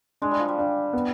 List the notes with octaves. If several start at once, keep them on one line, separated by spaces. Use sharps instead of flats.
G#3 D4
G3
F3
G3
D4
B3